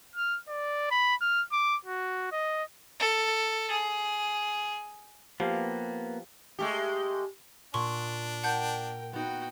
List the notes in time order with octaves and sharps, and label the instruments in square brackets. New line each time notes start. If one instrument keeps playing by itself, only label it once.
[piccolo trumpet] F6
D5
B5
F6
D6
F#4
D#5
[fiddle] A4
G#4
[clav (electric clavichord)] F3 [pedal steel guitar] A#3 B3 [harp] G4 F5
[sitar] G#3 A3 G4
[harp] A#2 [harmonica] D4 [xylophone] C6 C#6
[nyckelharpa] A#4 G5 [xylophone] F#5 A5 G6
[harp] B3 D#4 [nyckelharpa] F#4 G5